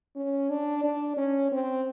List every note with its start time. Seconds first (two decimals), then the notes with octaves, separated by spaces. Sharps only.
0.16 C#4
0.50 D4
0.83 D4
1.17 C#4
1.52 C4